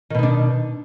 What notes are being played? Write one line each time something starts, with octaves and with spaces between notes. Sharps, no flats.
B2 D#3 D4 D#4